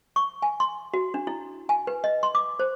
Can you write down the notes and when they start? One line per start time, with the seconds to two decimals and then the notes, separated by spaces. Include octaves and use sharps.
0.16 C#6
0.42 G#5
0.60 C6
0.94 F#4
1.14 D4
1.27 E4
1.69 G#5
1.87 B4
2.04 D#5
2.23 C6
2.35 D6
2.60 C5